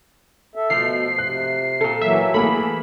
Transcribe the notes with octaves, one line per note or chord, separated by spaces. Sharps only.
A4 E5
B2 F3 A3 C7
C3 F#6
A#2 A4
E3 F#3 A#3 E5
E3 A3 A#3 G#4 A4 B5